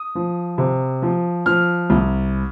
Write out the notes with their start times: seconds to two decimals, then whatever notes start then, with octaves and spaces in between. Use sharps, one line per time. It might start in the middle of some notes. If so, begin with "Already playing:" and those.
Already playing: D#6
0.15 F3
0.58 C3
1.02 F3
1.46 F3 F6
1.90 C2